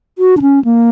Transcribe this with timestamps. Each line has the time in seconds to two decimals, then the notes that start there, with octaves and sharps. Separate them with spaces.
0.18 F#4
0.37 D4
0.42 C#4
0.65 A#3